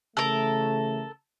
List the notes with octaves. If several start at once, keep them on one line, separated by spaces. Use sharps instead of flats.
C#3 E3 A3 A4 A#4